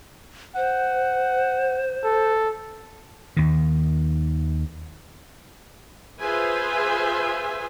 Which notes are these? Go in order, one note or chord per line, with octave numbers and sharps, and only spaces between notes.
C5 F#5
A4
D#2 D#3
F4 G#4 B4 C5 E5 G#5